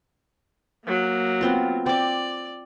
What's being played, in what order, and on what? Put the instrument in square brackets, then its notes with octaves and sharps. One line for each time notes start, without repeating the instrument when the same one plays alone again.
[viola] F#3 A#3
[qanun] B3 C4 F4
[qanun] C4 D6 [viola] D5